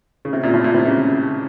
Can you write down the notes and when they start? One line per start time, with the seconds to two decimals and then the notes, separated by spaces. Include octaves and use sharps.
0.25 C#3
0.33 C3
0.43 A#2
0.54 A2
0.64 A#2
0.74 C3
0.85 C#3